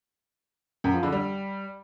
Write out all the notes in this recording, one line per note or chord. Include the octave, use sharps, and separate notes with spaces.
F#2
F3
D3
G3